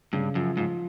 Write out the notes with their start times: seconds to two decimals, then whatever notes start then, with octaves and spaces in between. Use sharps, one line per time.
0.13 G2 C#3
0.35 F#2 F3
0.57 G#2 F3